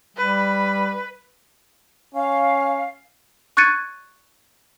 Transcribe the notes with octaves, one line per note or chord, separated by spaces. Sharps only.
G3 B4
C#4 F5
C#6 F#6 G#6 A6 C#7 D#7